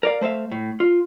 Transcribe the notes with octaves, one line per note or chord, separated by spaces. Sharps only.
A#4 D5 F5
A3 C5 E5 F5
A2
F4